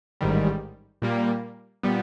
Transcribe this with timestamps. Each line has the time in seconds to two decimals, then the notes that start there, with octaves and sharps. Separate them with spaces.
0.21 A1 G#2 D#3 G3
1.02 A#2 G3 A#3
1.83 A#2 G3 B3